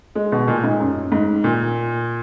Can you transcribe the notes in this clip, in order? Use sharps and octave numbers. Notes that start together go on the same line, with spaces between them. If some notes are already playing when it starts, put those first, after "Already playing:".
G#3
B2
A#2
G#2
F#2
G#2
A#2